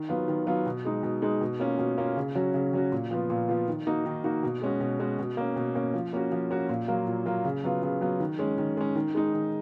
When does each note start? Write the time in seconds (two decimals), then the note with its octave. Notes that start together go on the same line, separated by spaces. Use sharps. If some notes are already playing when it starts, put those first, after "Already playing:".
Already playing: D#3
0.09 F#3 B3 F4
0.28 D#3
0.47 F#3 B3 F4
0.66 B2
0.85 G#3 D#4
1.03 B2
1.22 G#3 D#4
1.41 B2
1.60 A#3 C#4 F4
1.78 B2
1.98 A#3 C#4 F4
2.16 C#3
2.35 F#3 C#4 F#4
2.54 C#3
2.73 F#3 C#4 F#4
2.92 A#2
3.11 F3 B3 F4
3.30 A#2
3.49 F3 B3 F4
3.68 D#3
3.87 A#3 D#4 F#4
4.05 D#3
4.24 A#3 D#4 F#4
4.43 B2
4.62 G#3 C#4 F#4
4.80 B2
4.99 G#3 C#4 F#4
5.19 B2
5.37 A#3 C#4
5.56 B2
5.75 A#3 C#4
5.94 F3
6.13 A#3 C#4 F#4
6.32 F3
6.51 A#3 C#4 F#4
6.69 A#2
6.88 F#3 A#3 F4
7.07 A#2
7.26 F#3 A#3 F4
7.45 C#3
7.64 F#3 B3 F4
7.82 C#3
8.01 F#3 B3 F4
8.20 D#3
8.39 G#3 C#4
8.58 D#3
8.77 G#3 C#4
8.95 D#3
9.15 G#3 D#4
9.33 D#3